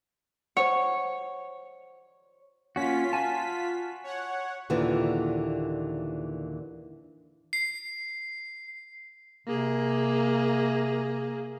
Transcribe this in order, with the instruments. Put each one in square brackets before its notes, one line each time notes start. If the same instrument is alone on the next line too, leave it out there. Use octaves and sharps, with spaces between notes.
[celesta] C5 F#5 [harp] C#5
[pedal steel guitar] A#3 C#4 F#4 [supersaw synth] F4 B6
[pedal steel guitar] F#4 G#5 A5
[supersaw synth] C#5 F#5
[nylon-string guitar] D#2 A#2 D3 E3
[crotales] C7
[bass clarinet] C3 [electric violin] A#3 G#4